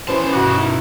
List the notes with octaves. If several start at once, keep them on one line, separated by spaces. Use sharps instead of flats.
D#3 E3 B3 C#4 C5 A5
G2 B2 F#4
D#4 E4 A#4